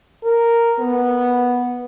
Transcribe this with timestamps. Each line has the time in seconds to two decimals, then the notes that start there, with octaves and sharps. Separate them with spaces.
0.23 A#4
0.79 B3